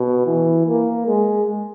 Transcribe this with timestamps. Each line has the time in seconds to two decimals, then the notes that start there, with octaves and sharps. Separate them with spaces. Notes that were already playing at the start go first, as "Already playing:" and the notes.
Already playing: B2
0.26 E3
0.67 A#3
1.07 G#3